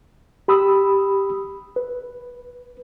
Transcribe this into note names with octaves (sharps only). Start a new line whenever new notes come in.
G4 B5 D#6 E6
B4